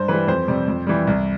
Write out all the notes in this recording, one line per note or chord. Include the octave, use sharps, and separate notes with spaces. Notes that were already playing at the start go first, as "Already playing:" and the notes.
Already playing: G2 C5
E3 G3 B4
F2 C5
C3 G3
F2
E3 G3
C2